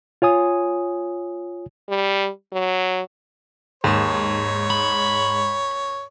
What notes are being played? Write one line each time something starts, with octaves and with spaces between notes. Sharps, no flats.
F4 C#5 G#5 D#6
G3
F#3
D#2 G#2 C#5 E7
B5